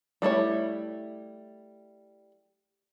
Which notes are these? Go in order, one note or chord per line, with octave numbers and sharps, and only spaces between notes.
G3 A3 E4 C#5